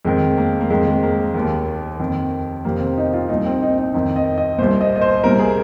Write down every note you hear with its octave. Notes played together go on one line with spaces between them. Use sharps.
F2 D#3 G#3
A#3
A#3
F2 D#3 G#3
G#3
A#3
D#2 D#3
F2 D#3
F2 C3 D#3 A#3
C4
D#4
F4
C2 A#2 D#4
C4
D#4
D#4
F2 D#3 D#4
D#5
D#5
C2 A#2 C5
D#5
D#5
C5
C2 A#2 A#4
G#4